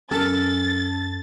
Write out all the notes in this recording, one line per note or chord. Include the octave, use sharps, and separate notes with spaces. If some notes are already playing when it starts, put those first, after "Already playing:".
F#2 C#4 A4 A#4 A6